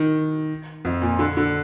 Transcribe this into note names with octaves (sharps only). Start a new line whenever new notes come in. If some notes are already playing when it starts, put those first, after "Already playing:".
Already playing: D#3
F2
A#2
D3
D3